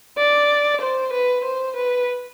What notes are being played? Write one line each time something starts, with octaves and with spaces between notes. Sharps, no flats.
D5
C5
B4
C5
B4